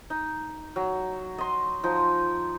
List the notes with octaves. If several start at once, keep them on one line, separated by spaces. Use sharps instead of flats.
D#4
F#3
D#5 C6
F3 D#4 C6